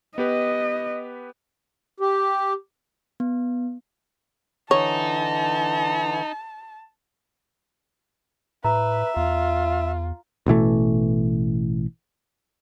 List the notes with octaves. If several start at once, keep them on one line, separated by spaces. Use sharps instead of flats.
B3 G4 B4 D#5
G4
B3
D3 E3 D#4 C#5 A5
A2 B4 E5 A#5
E2 F4
A1 B2 E3 A3